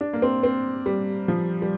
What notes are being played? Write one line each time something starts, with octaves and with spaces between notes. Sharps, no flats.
D4
A#3
C4
C4
G3
F3
G3